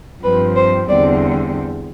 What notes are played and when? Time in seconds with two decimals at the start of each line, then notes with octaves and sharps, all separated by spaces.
0.23 G2 F3 C4 B4
0.56 C5
0.89 E2 D3 G3 C4 D5